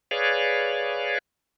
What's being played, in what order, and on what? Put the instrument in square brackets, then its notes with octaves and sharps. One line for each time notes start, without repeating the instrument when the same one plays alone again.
[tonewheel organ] G#4 B4 C#5 D5 F5